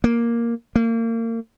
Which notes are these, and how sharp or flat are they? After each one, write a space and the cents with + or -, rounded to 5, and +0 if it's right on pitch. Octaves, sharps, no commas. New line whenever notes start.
A#3 +5
A#3 -35